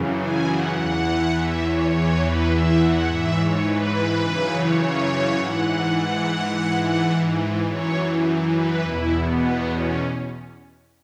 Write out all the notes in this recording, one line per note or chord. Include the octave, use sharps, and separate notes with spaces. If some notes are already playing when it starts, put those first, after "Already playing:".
Already playing: F#2 C#3 E3
G#5
F#5
E2 E3 F#5
E5
C#5
E2 E3 C#5
B4
E5
F#5
G#2 E3 E5
C#5
B4
F#2 C#3 E3
C#5
C#5
G#2 E3 F#5
F#5
F#5
G#2 E3
F#5
F#2 E3 C#5
B4
E2 B2 E4
B3
C#4